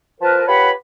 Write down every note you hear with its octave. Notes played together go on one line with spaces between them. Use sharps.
F3 A#4 B4 A5
F4 G4 B4 C#5 F#5 B5